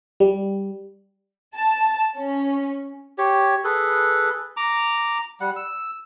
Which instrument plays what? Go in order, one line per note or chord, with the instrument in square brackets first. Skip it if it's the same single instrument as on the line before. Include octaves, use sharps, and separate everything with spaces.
[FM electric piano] G3
[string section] A5
C#4
[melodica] G4 C#5
G#4 A4 B4
A#5 D6
G3 F#5
E6